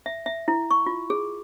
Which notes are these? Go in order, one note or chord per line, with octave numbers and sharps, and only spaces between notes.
E5
E5
E4
C#6
F4
G#4